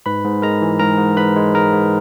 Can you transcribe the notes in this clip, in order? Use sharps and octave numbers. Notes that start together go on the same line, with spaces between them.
G#2 B4 B5
G#2
G#3 A#4 A#5
E3
G#2 A#4 A#5
G#2
G#2 B4 B5
G#3
G#2 A#4 A#5
G#2